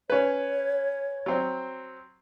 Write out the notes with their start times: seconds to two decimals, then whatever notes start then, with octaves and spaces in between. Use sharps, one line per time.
0.10 C#4 B4 C#5
1.26 F#3 C4